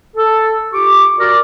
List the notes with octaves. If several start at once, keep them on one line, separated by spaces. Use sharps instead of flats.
A4
F4 G4 C#6 D6
F#4 A#4 D5